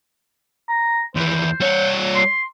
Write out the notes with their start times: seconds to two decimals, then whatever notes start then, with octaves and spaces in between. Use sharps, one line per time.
0.69 A#5
1.15 D#2 E3 C5
1.60 G3 C#5
2.16 C6